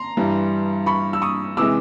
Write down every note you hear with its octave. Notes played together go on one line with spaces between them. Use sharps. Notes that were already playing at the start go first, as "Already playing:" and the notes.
Already playing: A#5 C6
G2 E3 G3
B5 C#6
E6
C#6 D#6
C3 E3 G#3 D6 E6